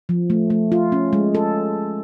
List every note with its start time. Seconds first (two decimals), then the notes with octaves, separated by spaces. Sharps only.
0.09 F3
0.30 A3
0.50 A3
0.72 F4
0.92 C#4
1.13 G#3
1.35 A4